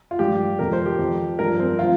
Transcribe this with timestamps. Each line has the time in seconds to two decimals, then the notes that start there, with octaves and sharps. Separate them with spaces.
0.11 F4
0.19 G2 F3 G4
0.59 F2 C3 F3 A#4
0.73 C5
0.86 G4
0.99 F2 F3
1.39 G2 F3 A#4
1.60 C4
1.79 F3 F4